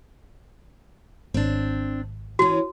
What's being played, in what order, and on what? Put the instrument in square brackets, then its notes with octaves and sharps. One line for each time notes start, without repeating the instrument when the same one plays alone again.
[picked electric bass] G#1 [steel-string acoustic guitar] C4 D4
[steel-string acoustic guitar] E3 C#4 [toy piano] F#4